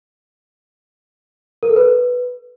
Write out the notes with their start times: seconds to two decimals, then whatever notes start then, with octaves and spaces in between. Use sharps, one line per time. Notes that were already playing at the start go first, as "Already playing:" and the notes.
1.63 A#4
1.69 A4
1.76 B4